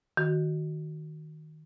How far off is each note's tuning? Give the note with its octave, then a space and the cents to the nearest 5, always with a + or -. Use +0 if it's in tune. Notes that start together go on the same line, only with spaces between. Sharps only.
D#3 +0 F#4 +0